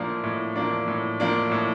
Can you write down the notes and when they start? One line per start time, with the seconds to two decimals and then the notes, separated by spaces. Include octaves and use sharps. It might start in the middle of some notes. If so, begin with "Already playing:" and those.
Already playing: A2 F3 A#3 D4
0.23 A2
0.56 F3 A#3 D4
0.88 A2
1.20 F3 A#3 D4
1.51 A2